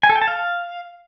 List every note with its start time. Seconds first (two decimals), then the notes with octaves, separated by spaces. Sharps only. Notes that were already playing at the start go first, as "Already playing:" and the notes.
0.03 G#5
0.09 A4
0.16 G5
0.22 A5
0.28 F5